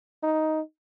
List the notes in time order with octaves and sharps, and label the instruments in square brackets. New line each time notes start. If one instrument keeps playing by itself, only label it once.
[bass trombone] D#4